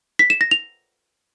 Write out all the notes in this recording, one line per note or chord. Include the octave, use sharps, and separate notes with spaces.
B6
E7
A#6
F7